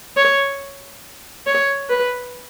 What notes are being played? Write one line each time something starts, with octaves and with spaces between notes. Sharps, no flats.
C#5
C#5
B4